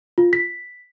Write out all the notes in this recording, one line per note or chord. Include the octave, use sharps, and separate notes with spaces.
F4
B6